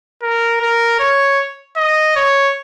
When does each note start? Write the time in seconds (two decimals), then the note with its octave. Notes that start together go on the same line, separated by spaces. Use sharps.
0.22 A#4
0.61 A#4
1.00 C#5
1.77 D#5
2.16 C#5